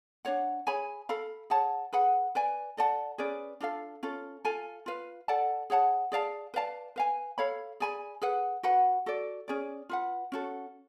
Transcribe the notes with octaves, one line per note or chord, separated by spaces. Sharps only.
D4 F#4 C#5 F#5
G#4 C#5 G#5 B5
A4 F5 B5
G#4 C#5 F#5 A5
G#4 B4 F#5 B5
B4 D5 G#5
A4 D5 F#5 A5
C#4 G#4 B4 D5
D4 F4 A4 F5
C#4 F4 A4
F4 A4 F5 G#5
F4 B4 F5
A4 D5 F#5 A5
G#4 C#5 F#5 A5
G#4 D5 F5 A5
B4 D5 F5 A5
B4 F5 G#5
A4 C#5 F5 B5
G#4 D5 G#5 B5
G#4 B4 F#5
F#4 B4 F#5 B5
F#4 A4 D5
C#4 G#4 D5
F4 B4 F#5
C#4 F#4 A4